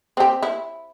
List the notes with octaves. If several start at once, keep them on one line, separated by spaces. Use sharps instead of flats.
C4 G4
E4